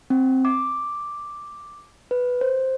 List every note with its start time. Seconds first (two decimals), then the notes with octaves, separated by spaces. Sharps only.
0.10 C4
0.45 D6
2.11 B4
2.41 C5